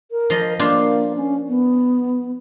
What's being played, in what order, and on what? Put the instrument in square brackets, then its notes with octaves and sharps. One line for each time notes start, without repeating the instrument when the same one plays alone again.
[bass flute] A#4
[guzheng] F3 D#5
[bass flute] A#3 [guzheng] D4 F4 C5
[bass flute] C#4
B3